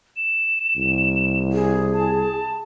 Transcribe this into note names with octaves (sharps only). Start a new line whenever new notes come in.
E7
C2
G#4
A5